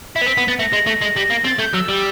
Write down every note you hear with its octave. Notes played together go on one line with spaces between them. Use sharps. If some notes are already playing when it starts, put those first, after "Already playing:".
E4 B6
B3
C4
B3
B3 A6
A3 A#6
G#3
A3
G#3
G3
A#3
C4 A6
A3 G6
F#3 E6
G3